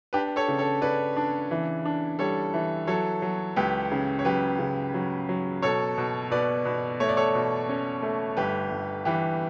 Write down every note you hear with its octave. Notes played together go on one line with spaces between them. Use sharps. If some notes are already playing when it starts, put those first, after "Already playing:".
D4 G4 B4
A4 C#5
C#3
A4 C#5
C#3 B4 D5
D4
E3
D4
G3 A4 C#5
E3
F#3 A4 C#5
F#3
C#2 G4 B4
C#3
C#5
F#3 G4 B4
C#3
F#3
F#3
B2 A4 C#5
B2
B2 B4 D5
B2
A3 C#5
D5
A4 C#5
B2
C#4
A3
G1 G4 B4
G1
E3 G4 B4